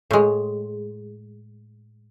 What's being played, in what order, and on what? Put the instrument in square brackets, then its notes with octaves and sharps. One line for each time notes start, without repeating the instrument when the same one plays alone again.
[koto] A2 G#3